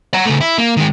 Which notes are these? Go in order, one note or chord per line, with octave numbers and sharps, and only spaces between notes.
F#5 A#5
C#3 A3
E4
A#3
D#3 G#3